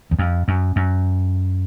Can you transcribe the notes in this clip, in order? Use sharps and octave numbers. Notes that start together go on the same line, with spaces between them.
E2
F2
F#2
F#2